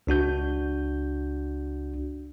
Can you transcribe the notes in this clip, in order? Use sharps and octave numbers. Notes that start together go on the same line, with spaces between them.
C#2 D4 F#4 G6